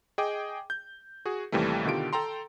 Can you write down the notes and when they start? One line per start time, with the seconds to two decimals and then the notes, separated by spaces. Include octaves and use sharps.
0.18 G#4 D#5 G5 D6
0.70 G6
1.25 F#4 G#4
1.52 D#2 C3 E3 G3 A3
1.85 B2 D3 D#3 F4 G4 D7
2.13 A4 G5 A#5 C6